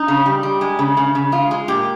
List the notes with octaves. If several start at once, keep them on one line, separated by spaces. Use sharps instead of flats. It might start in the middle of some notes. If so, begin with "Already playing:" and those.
Already playing: D#4
C#3
G3
G3
G#3
C#3
C#3
C#3
G#3 F4
G#3
A#2 G4